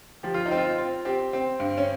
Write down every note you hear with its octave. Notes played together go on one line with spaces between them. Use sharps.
F3 G4
F4
D#4
C4
F4
C4
C4 G4
C4
G2
C#4